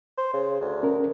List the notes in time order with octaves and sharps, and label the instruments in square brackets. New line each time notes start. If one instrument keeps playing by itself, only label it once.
[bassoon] C5
C#3
D2
[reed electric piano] C#4 A#4